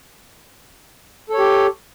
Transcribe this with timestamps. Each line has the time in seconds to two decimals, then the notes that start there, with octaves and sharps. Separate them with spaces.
1.30 A4
1.34 C#5
1.38 G4